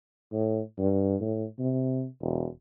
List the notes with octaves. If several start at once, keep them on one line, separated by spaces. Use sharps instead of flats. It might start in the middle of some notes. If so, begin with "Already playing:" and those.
A2
G2
A2
C3
E1